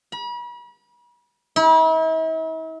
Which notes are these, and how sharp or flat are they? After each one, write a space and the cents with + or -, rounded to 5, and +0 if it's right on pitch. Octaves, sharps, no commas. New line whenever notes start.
B5 -40
E4 -45